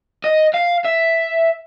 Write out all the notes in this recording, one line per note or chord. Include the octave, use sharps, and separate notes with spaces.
D#5
F5
E5